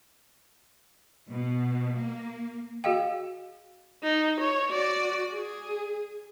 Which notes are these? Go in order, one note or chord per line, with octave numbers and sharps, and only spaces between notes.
B2
A#3
F#4 G#4 D#5 F5 G5
D#4
C#5
F#4 D5
G#4